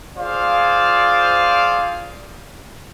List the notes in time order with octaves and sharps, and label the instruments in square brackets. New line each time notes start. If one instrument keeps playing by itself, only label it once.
[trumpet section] F4 G#4 C5 D5 F5